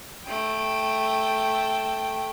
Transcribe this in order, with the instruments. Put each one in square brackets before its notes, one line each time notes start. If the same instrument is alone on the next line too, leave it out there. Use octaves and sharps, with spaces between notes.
[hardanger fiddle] A3 G5